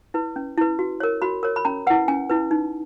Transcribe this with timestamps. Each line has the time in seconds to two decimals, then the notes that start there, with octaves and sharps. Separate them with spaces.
0.14 E4 B4
0.36 C#4
0.58 E4 B4
0.79 F#4
1.00 A#4 C#5
1.22 F#4 B5
1.43 A#4 C#5
1.56 B5
1.65 C#4 A#5
1.87 E4 B4 F#5
2.08 C#4 G#5
2.29 E4 B4
2.51 D#4